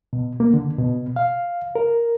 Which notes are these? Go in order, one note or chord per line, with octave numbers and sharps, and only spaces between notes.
B2
A#3
D3
B2
F5
A#4